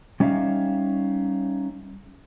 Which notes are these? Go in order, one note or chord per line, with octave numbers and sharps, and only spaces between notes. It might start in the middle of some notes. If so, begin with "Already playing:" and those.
G3 C#4 D#4 E5 F5